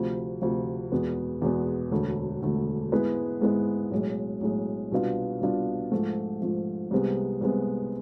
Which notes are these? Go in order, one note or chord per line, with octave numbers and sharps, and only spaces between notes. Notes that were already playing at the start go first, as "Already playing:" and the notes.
Already playing: D2 C3 F3
D2 C3 F3
E2 B2 G#3 B3
E2 B2 G#3 B3
E1 D2 D3 A3
E1 D2 D3 A3
G#2 G#3 B3 E4 B4
G#2 G#3 B3 E4 B4
B1 A2 G#3
B1 A2 G#3
C2 B2 B3 D4 F4
C2 B2 B3 D4 F4
G#2 F3 A3
G#2 F3 A3
C2 C3 G#3 B3
C2 C3 G#3 B3